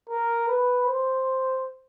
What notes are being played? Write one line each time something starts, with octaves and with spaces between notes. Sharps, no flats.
A#4
B4
C5